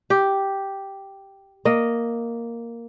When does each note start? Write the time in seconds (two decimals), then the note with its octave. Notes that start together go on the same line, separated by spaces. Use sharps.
0.10 G4
1.65 A#3 D#5